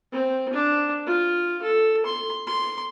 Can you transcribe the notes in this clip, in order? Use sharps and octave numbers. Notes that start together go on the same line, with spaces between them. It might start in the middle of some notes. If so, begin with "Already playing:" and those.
C4
D4
F4
A4
C6
C6